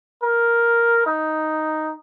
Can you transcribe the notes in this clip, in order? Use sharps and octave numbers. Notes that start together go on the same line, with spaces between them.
A#4
D#4